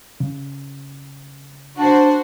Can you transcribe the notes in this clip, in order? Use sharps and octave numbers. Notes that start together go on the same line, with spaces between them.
C#3
D4 F#4 C5